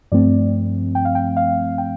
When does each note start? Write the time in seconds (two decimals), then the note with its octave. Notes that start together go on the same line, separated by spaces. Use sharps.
0.12 G2 F3 A3 C4 D5
0.95 G5
1.05 F5
1.15 G5
1.37 F5
1.78 G5